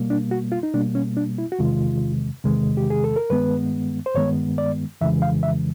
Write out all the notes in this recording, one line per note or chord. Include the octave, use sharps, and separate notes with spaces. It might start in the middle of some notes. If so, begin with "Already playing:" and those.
Already playing: B2 G3 A#3
D4
F#4
F4
D#4
B2 G3 A#3 D4
C#4
D4
E4
F#4
E2 C3 D#3 G#3 F4
E2 C3 D#3 G#3
G4
G#4
A4
A#4
G2 D#3 G#3 B3 B4
C5
G2 D#3 G#3 B3 C#5
D5
F2 C#3 E3 G#3 E5
F5
E5